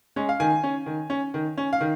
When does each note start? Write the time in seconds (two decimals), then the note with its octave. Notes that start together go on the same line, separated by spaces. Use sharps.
0.16 G#3 C#4
0.29 F5
0.40 D#3 G#5
0.63 C#4
0.86 D#3
1.10 C#4
1.34 D#3
1.57 C#4
1.73 F5
1.80 D#3